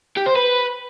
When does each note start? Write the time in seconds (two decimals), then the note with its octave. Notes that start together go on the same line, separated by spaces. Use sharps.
0.17 G4
0.26 C5
0.36 B4